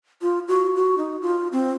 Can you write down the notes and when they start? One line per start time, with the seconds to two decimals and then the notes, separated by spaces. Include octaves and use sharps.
0.22 F4
0.48 F#4
0.76 F#4
0.98 D#4
1.22 F4
1.52 C4